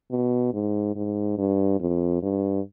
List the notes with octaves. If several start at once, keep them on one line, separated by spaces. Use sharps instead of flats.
B2
G#2
G#2
G2
F2
G2